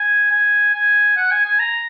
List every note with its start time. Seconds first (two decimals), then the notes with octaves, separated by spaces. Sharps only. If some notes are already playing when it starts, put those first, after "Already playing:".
Already playing: G#5
0.31 G#5
0.74 G#5
1.16 F#5
1.31 G#5
1.45 G#5
1.59 A#5